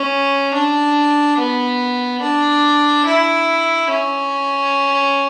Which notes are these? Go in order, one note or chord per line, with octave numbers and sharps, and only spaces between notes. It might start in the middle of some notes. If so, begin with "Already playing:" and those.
Already playing: C#4
D4
B3
D4
E4
C#4